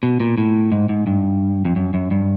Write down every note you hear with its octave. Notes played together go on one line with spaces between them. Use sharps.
B2
A#2
A2
G#2
G#2
G2
F2
F#2
F#2
G2